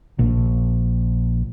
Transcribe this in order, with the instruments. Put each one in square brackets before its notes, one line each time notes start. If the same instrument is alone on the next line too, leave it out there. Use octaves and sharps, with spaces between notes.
[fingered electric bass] A#1